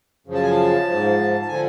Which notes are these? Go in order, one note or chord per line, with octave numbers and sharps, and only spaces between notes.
F#2 C#3 F3
A5
G#5
A5
G#2 F3
A5
D3 F3 G#5